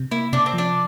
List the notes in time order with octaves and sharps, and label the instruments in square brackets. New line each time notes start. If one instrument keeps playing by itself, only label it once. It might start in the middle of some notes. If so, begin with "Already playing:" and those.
Already playing: [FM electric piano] C3
[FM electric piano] A#3 [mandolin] E4
[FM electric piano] C3 [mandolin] D4
[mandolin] C4
[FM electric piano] F3 [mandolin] D4